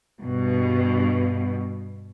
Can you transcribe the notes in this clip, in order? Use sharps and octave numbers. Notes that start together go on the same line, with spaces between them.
G2 B2